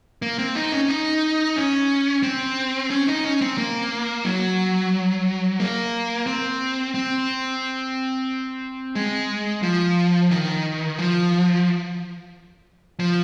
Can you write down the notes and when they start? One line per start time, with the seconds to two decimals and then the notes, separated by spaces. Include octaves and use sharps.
0.22 A#3
0.38 C4
0.55 D#4
0.72 C#4
0.89 D#4
1.56 C#4
2.23 C4
2.91 C#4
3.07 D#4
3.24 C#4
3.41 C4
3.58 A#3
4.25 F#3
5.60 A#3
6.27 C4
6.94 C4
8.95 G#3
9.63 F3
10.31 D#3
10.99 F3
13.00 F3